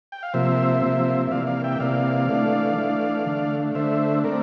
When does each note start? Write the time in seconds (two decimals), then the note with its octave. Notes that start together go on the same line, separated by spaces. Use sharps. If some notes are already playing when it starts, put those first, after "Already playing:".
0.12 G5
0.23 F5
0.34 C3 F3 A#3 C5 E5
0.83 C3 F3 A#3
1.27 E5
1.31 C3 E3 A#3 D5 F5
1.47 D5 F5
1.64 E5 G5
1.80 C3 E3 A#3 D5 F5
2.29 E3 A3 D4
2.78 E3 A3 D4
3.26 D3 A3 D4
3.75 D3 A3 D4 C5 E5
4.24 A3 C4 A#4 D5